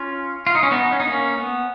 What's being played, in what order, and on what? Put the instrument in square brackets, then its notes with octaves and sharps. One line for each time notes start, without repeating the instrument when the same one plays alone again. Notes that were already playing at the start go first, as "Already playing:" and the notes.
Already playing: [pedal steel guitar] C#4 F4
F4
D#4
C#4
B3 D#4
C#4
D#4
A#3 C#4
B3